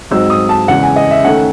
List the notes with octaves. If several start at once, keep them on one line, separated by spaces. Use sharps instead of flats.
G#2 F#3 C4 D#4 E6
D#6
A5
E2 C#3 G#3 F#5
G#5
D#5
E5
D#3 A3 C#4 F#5